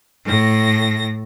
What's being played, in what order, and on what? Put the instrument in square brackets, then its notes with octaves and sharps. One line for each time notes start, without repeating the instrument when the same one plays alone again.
[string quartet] A2 A#6